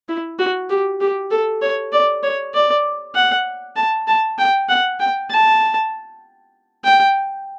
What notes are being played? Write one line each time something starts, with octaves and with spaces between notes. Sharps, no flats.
E4
F#4
G4
G4
A4
C#5
D5
C#5
D5
F#5
A5
A5
G5
F#5
G5
A5
G5